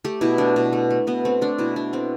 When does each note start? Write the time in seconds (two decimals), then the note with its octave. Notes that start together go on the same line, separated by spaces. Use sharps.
0.05 A3 G4
0.21 B2 E4
0.38 A3 D4
0.56 B2
0.73 A3
0.90 A3
1.07 B2 B3
1.25 A3 C4
1.41 A3 D4
1.58 B2 E4
1.76 B2 D4
1.93 A3 C4